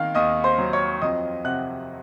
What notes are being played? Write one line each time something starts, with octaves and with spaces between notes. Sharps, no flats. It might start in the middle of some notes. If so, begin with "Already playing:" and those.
Already playing: D#3 A#3 F5 F6
D#2 D#5 D#6
C5 C6
F#3
C#5 C#6
F2 D#5 D#6
C3 F#5 F#6